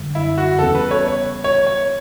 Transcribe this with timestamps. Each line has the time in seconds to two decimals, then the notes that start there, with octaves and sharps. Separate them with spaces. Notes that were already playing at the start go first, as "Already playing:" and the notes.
Already playing: F#2 D3 G3
0.15 E4
0.38 F#4
0.59 E2 C#3 G3 B3 A4
0.75 B4
0.91 C#5
1.08 C#5
1.44 C#5
1.67 C#5